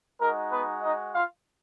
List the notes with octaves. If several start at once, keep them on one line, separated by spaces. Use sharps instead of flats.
G#3 D#4 F#4 A#4
B3 B4
D#4 D#5
F4 F5